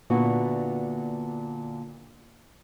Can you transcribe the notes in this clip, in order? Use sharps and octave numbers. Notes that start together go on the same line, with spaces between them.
A#2 D3 B3 E4 F#4